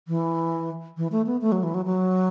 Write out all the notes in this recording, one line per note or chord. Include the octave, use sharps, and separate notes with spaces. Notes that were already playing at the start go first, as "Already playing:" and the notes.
E3
E3
A3
B3
A3
F#3
E3
F#3
F#3